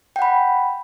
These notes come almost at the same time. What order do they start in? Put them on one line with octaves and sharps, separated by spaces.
G5 F#5 B5